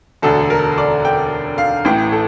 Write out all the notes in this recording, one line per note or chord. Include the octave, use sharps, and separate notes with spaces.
E1 D2 D3 A4
A#4
D5
G5
F5
A1 A2 E3 G5
A4